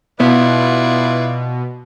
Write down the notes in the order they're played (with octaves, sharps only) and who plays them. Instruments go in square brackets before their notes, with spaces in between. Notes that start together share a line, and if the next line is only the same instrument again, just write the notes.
[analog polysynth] B2 [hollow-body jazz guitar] B3 [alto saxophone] E4 [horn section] F4 B4 D5